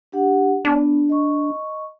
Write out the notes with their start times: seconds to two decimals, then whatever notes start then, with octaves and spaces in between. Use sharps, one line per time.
0.12 D4 G4 F#5
0.65 B3 D4
1.09 D#5 C#6